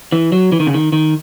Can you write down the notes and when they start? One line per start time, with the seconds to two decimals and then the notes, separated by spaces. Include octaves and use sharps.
0.12 E3
0.32 F#3
0.52 E3
0.60 D#3
0.67 C#3
0.74 D#3
0.92 D#3